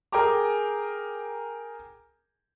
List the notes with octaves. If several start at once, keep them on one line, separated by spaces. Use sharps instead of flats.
G#4 A#4 G5 G#5 A#5 D6